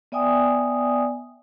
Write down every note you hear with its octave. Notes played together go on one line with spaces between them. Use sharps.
B3 D5 E5 G5 G#5 D#6